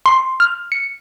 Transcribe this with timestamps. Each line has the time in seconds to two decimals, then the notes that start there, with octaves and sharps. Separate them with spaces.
0.06 C6
0.40 F6
0.72 C#7